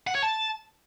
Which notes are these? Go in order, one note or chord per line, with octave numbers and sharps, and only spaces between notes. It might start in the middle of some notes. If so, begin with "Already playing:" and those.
F#5
C#5
A5